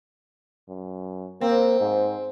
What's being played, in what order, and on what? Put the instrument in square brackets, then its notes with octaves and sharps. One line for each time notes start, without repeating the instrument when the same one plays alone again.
[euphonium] F#2
[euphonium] A#3 [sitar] C4
[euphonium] G#2